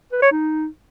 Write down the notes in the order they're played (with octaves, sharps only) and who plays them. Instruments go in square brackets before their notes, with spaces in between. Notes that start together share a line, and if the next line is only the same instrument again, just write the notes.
[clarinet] B4
C#5
D#4